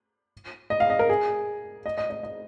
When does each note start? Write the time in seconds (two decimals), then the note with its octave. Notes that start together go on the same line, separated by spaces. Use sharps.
0.70 D#5
0.80 F5
0.90 D#5
0.99 A#4
1.09 G#4
1.86 D#5
1.98 D#5
2.10 D#5
2.23 D#5